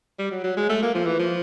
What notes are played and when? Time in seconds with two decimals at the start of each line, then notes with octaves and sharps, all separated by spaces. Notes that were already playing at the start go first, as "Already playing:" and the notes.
0.19 G3
0.32 F#3
0.44 F#3
0.57 G#3
0.69 A3
0.82 A#3
0.95 F3
1.06 E3
1.19 F3